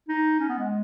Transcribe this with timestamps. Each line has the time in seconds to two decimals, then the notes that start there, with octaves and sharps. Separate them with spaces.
0.09 D#4
0.39 C#4
0.49 B3
0.59 G#3